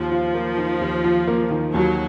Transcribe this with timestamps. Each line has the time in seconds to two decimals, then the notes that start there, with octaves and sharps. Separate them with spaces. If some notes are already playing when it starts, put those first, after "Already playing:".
Already playing: D#2 F3
0.12 F4
0.34 A#3
0.58 D#3
0.81 D#2
1.04 F4
1.27 A#3
1.51 D#3
1.73 D#2 F#3